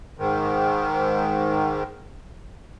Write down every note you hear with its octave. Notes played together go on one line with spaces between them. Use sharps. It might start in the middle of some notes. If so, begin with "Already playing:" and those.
G#2 D#3